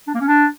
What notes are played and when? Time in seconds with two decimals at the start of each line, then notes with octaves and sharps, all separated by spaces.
0.08 D4
0.14 A#3
0.21 C#4
0.27 D4